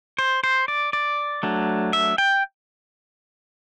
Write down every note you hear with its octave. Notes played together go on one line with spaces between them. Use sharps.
C5
C5
D5
D5
F#3 A3 D4
E5
G5